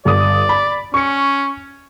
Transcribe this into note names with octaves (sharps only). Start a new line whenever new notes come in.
G1 D5 D#6
B5
C#4 C#6 C#7